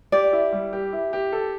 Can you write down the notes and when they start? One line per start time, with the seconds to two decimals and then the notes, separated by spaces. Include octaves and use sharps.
0.12 G4 D5
0.33 E4
0.52 G3
0.73 G4
0.93 E4
1.13 G4
1.32 A4